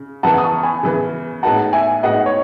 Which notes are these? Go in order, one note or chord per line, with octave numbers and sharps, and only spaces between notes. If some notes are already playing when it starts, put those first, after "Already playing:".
Already playing: C#3
C#3 E3 B3 F#5 A5
D#6
A5 C#6
G#5 B5
C#3 E3 B3
A2 G#3 B3 D#4 F#4 F#5 A5
E5 G#5
A2 G#3 B3 D#4 F#4 D#5 F#5
C#5